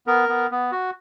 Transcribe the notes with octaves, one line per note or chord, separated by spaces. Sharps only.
B3 A#4
B3
B3
F#4